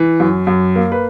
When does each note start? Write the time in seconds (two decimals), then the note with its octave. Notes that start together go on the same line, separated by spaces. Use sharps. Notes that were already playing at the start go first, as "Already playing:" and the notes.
Already playing: E3
0.20 F#2
0.47 F#2
0.76 A#3
0.92 B4